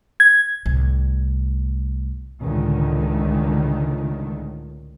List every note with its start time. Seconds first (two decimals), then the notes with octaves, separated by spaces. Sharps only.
0.20 G#6
0.66 C2 A2
2.43 C#2 A2 D3 D#3